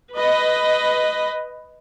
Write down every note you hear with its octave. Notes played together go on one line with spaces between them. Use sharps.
B4 D#5